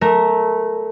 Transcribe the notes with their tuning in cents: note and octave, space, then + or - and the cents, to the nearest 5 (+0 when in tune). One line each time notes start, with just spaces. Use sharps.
A3 -15 A#4 +0